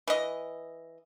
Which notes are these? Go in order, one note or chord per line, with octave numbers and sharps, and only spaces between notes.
E3 D#5